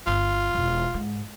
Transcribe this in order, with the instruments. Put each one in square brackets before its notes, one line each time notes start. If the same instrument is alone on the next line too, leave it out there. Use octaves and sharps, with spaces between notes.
[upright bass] G1 [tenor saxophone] F4
[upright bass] E1
G#2